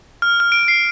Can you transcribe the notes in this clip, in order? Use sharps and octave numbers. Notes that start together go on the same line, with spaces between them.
F6
F6
D7
C7